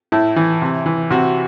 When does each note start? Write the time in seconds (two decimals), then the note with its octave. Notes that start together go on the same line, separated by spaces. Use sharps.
0.12 A2 E4
0.36 E3
0.62 C3
0.86 E3
1.10 C3 F#4